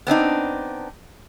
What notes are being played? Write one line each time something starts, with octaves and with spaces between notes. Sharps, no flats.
B3 C4 D4 D#4